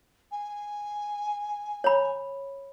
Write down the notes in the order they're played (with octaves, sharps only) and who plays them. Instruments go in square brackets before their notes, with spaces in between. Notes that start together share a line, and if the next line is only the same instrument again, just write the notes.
[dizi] G#5
[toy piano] C#5 B5